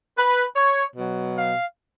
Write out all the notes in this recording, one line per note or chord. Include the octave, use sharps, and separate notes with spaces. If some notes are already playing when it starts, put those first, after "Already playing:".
B4
C#5
B2 F#3
F5